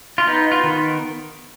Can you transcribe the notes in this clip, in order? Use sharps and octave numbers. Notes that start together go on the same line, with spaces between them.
F4
B3 D#4
F4
D#3